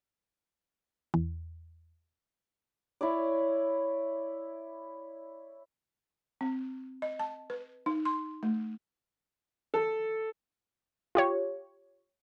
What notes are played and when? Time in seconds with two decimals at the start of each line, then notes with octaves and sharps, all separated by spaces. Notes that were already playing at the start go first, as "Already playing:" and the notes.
1.14 E2
3.01 E4 C#5 D5
6.41 C4
7.02 D#5
7.19 A5
7.50 B4
7.86 D#4
8.05 C6
8.43 A3
9.74 A4
11.15 F4 G4 C#5